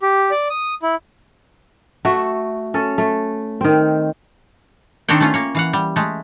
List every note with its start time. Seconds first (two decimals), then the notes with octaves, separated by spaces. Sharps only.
0.02 G4
0.31 D5
0.50 D#6
0.83 E4
2.05 A3 F#4 E5
2.74 C#4 A4
2.98 A3
3.61 D#3 C4
5.08 D#3 C4 D4 A4 C#5 G5
5.20 A3 C#4 F4
5.34 A#3 C#5
5.55 E3 F5 F#5
5.73 G3
5.96 G#3 A3